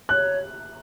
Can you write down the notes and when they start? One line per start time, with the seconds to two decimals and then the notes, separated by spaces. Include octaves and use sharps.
0.09 C#5 F#6